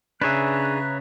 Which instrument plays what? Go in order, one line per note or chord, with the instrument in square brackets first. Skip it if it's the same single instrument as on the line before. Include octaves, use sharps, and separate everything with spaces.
[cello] C#3 [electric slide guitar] D4 G#4 [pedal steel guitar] B4 C#5 E5 [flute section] A#5 F#6